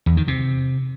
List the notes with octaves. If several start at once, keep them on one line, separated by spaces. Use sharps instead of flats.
E2
D#3
C3